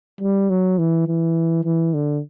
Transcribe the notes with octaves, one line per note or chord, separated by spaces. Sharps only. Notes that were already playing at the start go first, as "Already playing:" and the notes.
G3
F#3
E3
E3
E3
D3